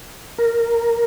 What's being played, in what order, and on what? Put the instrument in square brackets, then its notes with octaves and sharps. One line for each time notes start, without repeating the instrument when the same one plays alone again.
[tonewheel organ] A#4